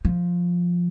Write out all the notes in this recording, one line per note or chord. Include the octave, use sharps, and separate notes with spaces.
F3